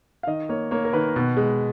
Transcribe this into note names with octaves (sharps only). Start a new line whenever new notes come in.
F5
D#3 D#5
A#3 C#5
A#3 C#5
A#4
D#3 B4
B2
G#3